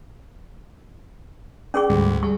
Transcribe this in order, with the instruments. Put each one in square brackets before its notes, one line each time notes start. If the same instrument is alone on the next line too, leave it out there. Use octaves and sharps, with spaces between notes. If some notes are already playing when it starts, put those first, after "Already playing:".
[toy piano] C#4 G#4 C#6 [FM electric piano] D5 G5
[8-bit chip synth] D2 [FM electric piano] G#2 G3
[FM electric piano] G3 G#4 [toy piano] C#6